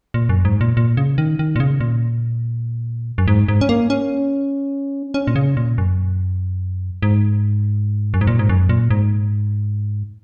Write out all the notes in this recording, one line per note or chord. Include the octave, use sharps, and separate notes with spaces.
A#2
F#2
G#2
A#2
A#2
C#3
D#3
D#3
A#2
C#3
A#2
F#2
G#2
G#2
C#4
A#3
C#4
C#4
A#2
C#3
A#2
F#2
G#2
F#2
G#2
A#2
G#2
F#2
A#2
G#2